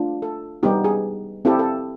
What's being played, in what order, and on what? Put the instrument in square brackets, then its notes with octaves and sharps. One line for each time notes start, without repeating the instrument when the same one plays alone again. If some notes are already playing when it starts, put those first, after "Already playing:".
Already playing: [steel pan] A3 D4 F4
A4
G3 B3 D#4 G4
G#4
C4 E4 G4 A4
A4